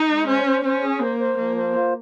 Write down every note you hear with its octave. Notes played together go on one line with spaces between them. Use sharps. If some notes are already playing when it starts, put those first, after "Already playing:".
Already playing: D#4
G#3
C#4 C5
C5
C#4 C5
G#4
A#3 C5
C5
F3 A#3
C5
F4